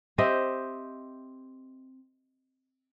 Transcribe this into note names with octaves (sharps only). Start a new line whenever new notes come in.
C4 G4 D#5 E5